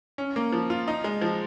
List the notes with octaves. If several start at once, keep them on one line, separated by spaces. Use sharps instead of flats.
C#4
A#3
F3
F4
D#4
G#3
F3